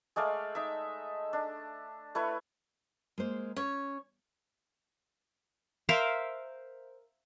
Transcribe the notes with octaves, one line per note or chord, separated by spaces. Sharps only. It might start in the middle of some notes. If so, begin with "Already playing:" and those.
G#3 A3 D5 F5
D#4 E5
D4
A3 E4 B4 C#5
G#3 A#3 C5
C#4 C#5
A#4 C5 E5 F5